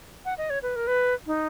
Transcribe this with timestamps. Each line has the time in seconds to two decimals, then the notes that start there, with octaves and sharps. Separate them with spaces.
0.25 F#5
0.38 D#5
0.50 C#5
0.63 B4
0.76 A#4
0.87 B4
1.27 D#4